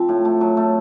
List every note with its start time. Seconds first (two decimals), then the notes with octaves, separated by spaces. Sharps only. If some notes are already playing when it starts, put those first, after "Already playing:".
Already playing: F3 C4
0.09 A2
0.25 A3
0.41 F#3
0.57 A3